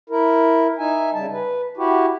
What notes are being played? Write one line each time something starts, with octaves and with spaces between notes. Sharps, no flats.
E4 A#4
D#4 E5 G#5
C#3 G3 A5
B4
E4 F#4 G4